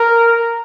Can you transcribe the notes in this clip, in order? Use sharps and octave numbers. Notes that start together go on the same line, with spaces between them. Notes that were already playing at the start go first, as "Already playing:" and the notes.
Already playing: A#4